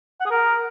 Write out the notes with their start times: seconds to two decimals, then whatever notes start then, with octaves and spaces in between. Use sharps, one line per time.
0.20 F#5
0.26 G#4
0.31 A#4